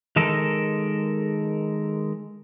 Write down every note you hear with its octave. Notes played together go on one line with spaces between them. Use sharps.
D#3 G#3 A4 A#4